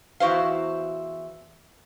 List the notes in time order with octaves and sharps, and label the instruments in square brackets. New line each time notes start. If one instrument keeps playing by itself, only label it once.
[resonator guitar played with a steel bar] E2 E4 F#4 C5 F5